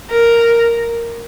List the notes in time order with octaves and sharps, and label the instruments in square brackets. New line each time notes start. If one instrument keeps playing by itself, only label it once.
[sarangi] A#4